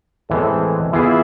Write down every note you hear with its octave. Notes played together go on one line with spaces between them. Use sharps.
A2 E3 G#3 C4 A4
E3 B3 E4 F4 G#4